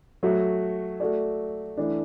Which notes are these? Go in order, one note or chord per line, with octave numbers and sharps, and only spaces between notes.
F#3 A3 F#4
A3 F#4 A4 D5
E3 A3 D4